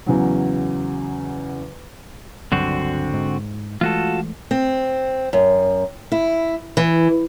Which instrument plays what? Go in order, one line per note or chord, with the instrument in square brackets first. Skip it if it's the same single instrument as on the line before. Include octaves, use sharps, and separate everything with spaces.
[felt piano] E2 C#3 F#3
[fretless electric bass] C#2 G2 F#3 [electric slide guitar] D3 C4 F#4
[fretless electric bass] G#2
[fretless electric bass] E3 G#3 A3 [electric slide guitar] F4 F#4 A4
[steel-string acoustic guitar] C4
F#2
E4
E3